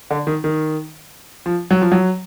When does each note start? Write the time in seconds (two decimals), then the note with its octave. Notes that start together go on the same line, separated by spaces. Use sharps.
0.10 D3
0.27 D#3
0.44 D#3
1.46 F3
1.71 F#3
1.82 F3
1.92 F#3